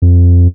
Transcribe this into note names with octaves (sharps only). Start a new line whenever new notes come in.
F2